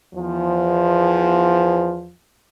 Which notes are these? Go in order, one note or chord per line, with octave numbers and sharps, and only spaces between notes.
E2 F3